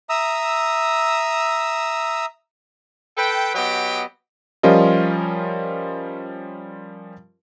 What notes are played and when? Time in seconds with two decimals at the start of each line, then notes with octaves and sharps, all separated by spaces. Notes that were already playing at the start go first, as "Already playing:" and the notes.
0.09 E5 A#5 D#6 E6
3.18 A4 B4 G5
3.55 F#3 B3 G4 D#5 G5
4.63 F3 G3 C#4 F4 A#4 D#5